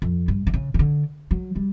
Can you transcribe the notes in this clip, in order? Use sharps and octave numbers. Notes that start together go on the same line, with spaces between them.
F2
G2
D3
C#3
D#3
D3
F#3
G3